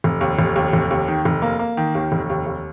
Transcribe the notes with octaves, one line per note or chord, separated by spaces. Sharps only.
F1
D#2
F1
D#2
F1
D#2
D#3
F1
A#3
A#3
D#3
D#2
F1
D#2
D#2